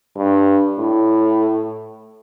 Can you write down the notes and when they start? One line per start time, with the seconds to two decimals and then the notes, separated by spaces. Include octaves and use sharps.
0.16 G2
0.79 A2